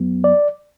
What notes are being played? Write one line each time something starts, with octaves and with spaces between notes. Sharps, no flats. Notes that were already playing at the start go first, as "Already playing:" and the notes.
Already playing: F#2 F#3 B3
D5